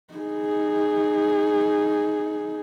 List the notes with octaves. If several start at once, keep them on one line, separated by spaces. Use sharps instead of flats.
D#4 G#4